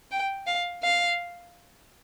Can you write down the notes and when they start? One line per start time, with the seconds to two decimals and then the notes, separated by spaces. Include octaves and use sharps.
0.11 G5
0.47 F5
0.83 F5